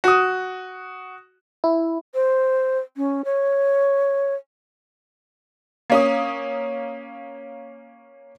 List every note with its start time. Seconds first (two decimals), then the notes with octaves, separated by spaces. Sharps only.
0.04 F#4 D#6
1.64 E4
2.14 C5
2.97 C#4
3.25 C#5
5.90 A#3 C#4 D#6